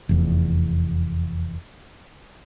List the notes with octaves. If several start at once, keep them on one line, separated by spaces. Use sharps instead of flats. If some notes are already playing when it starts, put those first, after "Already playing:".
F1 E2